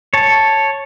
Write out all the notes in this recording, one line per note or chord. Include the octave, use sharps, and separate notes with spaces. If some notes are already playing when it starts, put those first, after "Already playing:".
C#5 A5